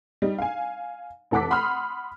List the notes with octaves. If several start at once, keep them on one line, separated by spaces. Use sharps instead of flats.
G3 D#4
F5 G#5
F1 E3 A4 F#5 D6 B6
F#5 B5 C6 D#6 F6